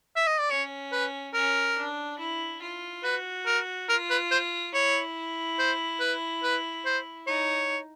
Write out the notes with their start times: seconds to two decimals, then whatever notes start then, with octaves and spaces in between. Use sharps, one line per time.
0.16 E5
0.27 D#5
0.39 D5
0.49 C#4 C#5
0.92 B4
1.34 C#4 A#4
1.78 D4
2.19 E4
2.62 F4
3.04 F#4 B4
3.46 A#4
3.88 F4 A#4
4.10 B4
4.31 C5
4.73 E4 C#5
5.59 C5
6.00 B4
6.43 B4
6.85 C5
7.27 D#4 C#5